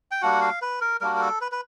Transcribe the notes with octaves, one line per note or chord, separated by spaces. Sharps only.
G5
G3 A#3 D4 F#4 F#5
F5
B4
A#4
G3 A#3 D4 F#4 A#4
A#4
A4
B4
B4